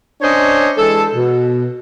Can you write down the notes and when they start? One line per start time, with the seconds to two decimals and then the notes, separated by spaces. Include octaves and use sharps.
0.21 C#4 D4 C5 C#5 D#5
0.78 E3 G#3 A4
1.14 B2